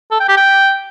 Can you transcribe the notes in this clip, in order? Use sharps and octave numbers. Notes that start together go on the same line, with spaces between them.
A4
G5
G4
G5